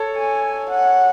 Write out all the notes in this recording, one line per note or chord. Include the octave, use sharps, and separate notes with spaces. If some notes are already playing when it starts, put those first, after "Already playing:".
Already playing: A4 C#5
G#5
F#5